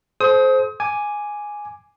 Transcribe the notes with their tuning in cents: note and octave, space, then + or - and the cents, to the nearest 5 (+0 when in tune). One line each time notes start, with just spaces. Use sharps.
A4 -40 C5 +0 D#6 +35
G#5 +0 D6 +0